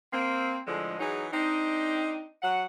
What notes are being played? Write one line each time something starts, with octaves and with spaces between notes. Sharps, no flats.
A#3 C4
A2 D3 F3 G#3
E3 F#3 D#4 G#4
C4 D4 D#4
F#3 F#5